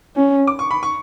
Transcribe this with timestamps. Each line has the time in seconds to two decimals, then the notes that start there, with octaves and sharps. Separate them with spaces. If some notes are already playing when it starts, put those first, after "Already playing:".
0.16 C#4
0.47 D6
0.59 C#6
0.71 B5
0.83 C#6